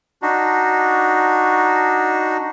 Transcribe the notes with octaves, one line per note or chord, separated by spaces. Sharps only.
D4 D#4 F#4